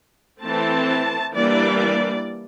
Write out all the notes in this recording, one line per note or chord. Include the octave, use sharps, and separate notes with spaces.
E3 A3 C4 A5
E3 G3 A#3 D4 D5